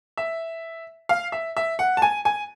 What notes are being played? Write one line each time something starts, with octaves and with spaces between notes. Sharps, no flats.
E5
F5
E5
E5
F#5
A5
G#5
G#5